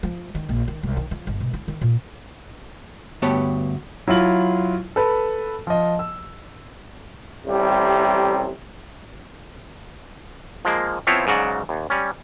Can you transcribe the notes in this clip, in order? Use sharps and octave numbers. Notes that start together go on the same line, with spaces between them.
F3
D#3
A#1
D#3
C2
D#3
F3
G1
B2
E4
D#3
A#2
D2 G2 B3 G4 C#5 A5
F#3 E4 F4 F#7
A4 B4
F3 D#5
E6
A1 C3 G3
F3 G#3 A#3
F3 B3 C4 E4 F4 C#5
G#2 C#3 F#3 F#4 D5
D#2
G3 C#4